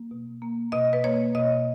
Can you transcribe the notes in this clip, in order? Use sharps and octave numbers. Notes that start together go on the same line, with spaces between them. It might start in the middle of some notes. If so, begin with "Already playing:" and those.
Already playing: A#3
B2
A#3
B2 D#5
B4
A#3 C#5
B2 D#5